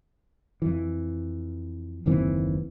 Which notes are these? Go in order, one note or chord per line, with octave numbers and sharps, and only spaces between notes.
F2 E3
F#1 D#2 E3 C4